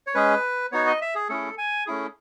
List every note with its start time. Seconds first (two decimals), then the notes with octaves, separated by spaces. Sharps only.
0.07 C#5
0.15 G#3 C#4 G#4 B4
0.72 B3 D#4 F#4 C#5
0.87 D#5
1.01 E5
1.15 G#4
1.29 A3 C#4 E4 G#4 A4
1.58 G#5
1.86 A3 C#4 E4 G#4